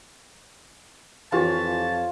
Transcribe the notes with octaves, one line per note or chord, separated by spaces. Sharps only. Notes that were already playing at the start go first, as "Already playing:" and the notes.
F2 E3 F4 G4 C#5 A5